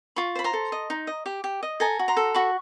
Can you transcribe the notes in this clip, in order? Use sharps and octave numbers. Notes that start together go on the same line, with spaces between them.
F4 B5 C#6
C5 B5
A#5 C6
A4
D#5
D#4
D#5
G4
G4
D#5
A4 G#5 A#5
F#4
A#5 C6
A4
F#4 B5 C#6